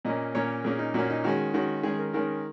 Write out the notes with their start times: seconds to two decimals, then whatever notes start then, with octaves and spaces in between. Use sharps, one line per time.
0.05 A#2 A#3 C#4 D#5
0.35 A#2 A#3 C#4 C#5
0.64 A#2 A#3 C#4 G#4
0.79 D#4
0.94 A#2 A#3 C#4 F#4
1.10 D#4
1.24 D#3 G#3 C#4 F#4
1.54 D#3 G#3 C#4 F#4
1.83 D#3 G#3 C#4 G#4
1.98 A#4
2.13 D#3 G#3 C#4 A#4